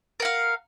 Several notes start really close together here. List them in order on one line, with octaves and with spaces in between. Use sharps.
A#4 F#5 F5